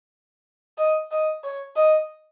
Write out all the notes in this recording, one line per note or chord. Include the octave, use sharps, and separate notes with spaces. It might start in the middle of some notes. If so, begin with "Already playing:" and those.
D#5
D#5
C#5
D#5